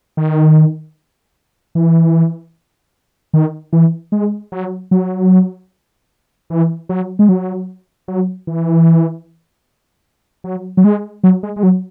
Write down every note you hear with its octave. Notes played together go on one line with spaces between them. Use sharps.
D#3
E3
D#3
E3
G#3
F#3
F#3
E3
F#3
G#3
F#3
F#3
E3
F#3
F#3
G#3
F#3
G#3
G#3
F#3